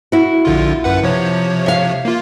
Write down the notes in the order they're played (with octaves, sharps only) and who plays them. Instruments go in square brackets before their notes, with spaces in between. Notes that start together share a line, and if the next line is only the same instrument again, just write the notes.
[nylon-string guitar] E4 F#4
[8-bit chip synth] A#1 D3 F4
F#2 B4 F#5
C3 F3 C#5
[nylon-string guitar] E5 F5
[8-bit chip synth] A#3 F4